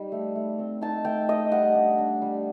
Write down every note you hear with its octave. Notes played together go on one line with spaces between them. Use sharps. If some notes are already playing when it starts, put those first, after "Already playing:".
Already playing: G3 D#4
A3
A3
C4
D#4 A5
A3 G5
A3 D#5
G3 F#5
D4
D4
G3